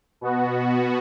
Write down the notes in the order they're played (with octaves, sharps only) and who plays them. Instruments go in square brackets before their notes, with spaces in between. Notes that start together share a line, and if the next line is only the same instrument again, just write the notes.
[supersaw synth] B2 B3 F#4